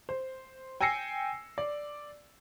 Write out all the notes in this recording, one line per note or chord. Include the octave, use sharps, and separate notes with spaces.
C5
G5 G#5 E6 A#6 C7 C#7
D5